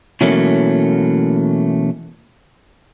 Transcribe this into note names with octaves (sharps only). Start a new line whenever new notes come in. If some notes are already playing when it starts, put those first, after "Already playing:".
B2 E3 F#3 A3 A#3 C#4